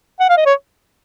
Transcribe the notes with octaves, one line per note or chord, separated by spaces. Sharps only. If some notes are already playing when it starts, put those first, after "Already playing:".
F#5
F5
D#5
C#5